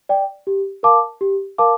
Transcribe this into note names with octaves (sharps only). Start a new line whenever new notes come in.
D5 G5
G4
A#4 F5 A5 D6
G4
A#4 F5 A5 D6